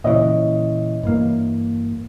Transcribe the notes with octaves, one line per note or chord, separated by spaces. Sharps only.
A#2 C#3 E3 C#5 D#5 E5
G2 E3 A#3